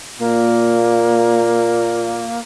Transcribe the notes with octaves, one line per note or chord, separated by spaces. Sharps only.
A#2 A#3